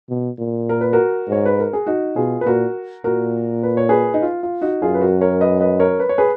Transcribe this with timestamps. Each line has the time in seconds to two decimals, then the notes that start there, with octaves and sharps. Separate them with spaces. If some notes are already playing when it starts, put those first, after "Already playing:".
0.10 B2
0.39 A#2
0.69 A#4
0.81 B4
0.93 F#4 A#4
1.28 G#2 C#5
1.46 B4
1.60 A#4
1.73 G#4
1.87 D#4 F#4
2.16 B2 F4 G#4
2.41 B4
2.45 A#2 F#4 A#4
3.04 A#2 F#4 A#4
3.63 B4
3.77 C#5
3.89 G#4 B4
4.14 D#4
4.22 F4
4.43 F4
4.62 D#4 F#4
4.82 F#2 F4 G#4
4.94 B4
5.01 F#4 A#4
5.21 A#4 C#5
5.41 B4 D#5
5.61 B4 D#5
5.80 A#4 C#5
6.00 B4
6.09 C#5
6.18 G#4 B4